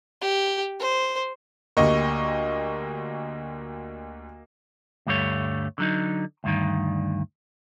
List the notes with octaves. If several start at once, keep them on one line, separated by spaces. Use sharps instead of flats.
G4
C5
D2 A#3 G4 D#5 C#6
D2 G2 G3 A3 C#5
D3 F#3 D#4
D2 G2 D#3